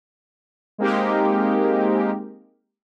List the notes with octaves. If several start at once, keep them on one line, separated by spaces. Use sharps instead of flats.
G#3 A#3 C4 D#4 G4 A#4